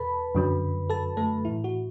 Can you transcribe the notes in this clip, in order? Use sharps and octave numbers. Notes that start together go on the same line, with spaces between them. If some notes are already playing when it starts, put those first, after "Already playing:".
Already playing: E2 B2 A4 B4 A5 B5
F#2 D3 F#3
A4 A5
A3 A4
A2 E3 E4
F#4